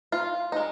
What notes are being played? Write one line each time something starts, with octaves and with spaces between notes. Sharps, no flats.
F4
G#3 D#4